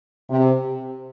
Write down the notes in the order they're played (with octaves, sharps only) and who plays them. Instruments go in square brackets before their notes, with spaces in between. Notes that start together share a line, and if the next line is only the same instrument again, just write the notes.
[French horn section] C3